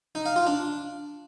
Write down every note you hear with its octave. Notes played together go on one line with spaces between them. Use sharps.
D#4
F5
F4
D4